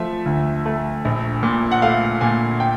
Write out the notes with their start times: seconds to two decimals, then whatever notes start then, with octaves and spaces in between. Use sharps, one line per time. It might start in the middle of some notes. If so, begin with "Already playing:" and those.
Already playing: F3 A3 E5
0.26 D2
0.66 A3
1.05 A#1
1.43 A#2
1.71 F#5
1.82 A3 F5
2.21 A#2 G#5
2.60 G5